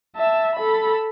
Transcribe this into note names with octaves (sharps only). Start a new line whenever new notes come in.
E5 A5
A4 B5